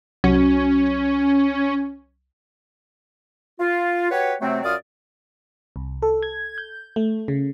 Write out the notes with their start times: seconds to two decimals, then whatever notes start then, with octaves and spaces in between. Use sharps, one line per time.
0.24 C2 F#3 C#4 F#4
3.59 F4
4.11 F#4 G4 B4 C#5
4.41 C3 F#3 A3 C4
4.64 F#2 F4 F#4 D5 D#6 F6
5.76 C2
6.02 A4
6.23 G#6
6.58 G6
6.96 A3
7.28 C#3